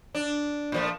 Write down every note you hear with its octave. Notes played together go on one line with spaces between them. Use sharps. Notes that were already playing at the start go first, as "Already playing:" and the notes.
D4
A#2 F3 A3